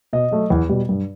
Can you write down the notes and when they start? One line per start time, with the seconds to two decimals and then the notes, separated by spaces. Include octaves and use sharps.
0.13 B2 D#5
0.31 F#3 A3
0.50 E2
0.69 B2 G3
0.89 G2